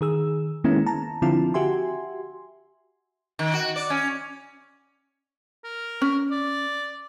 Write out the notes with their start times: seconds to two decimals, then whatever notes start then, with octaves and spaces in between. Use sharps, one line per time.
0.01 D#3 G#4 E6
0.64 D#3 G#3 A#3 B3 C#4 E4
0.86 A5 A#5
1.22 D3 F3 C4 E4 F4 A5
1.54 F#4 G4 E5 G#5 C6
3.39 D#3
3.53 F#4
3.76 D5
3.90 C#4
5.64 A#4
6.02 C#4
6.31 D5